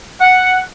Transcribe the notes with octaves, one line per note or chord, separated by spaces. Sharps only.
F#5